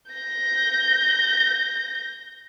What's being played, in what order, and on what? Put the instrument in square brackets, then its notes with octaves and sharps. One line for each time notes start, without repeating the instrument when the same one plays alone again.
[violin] G6 A#6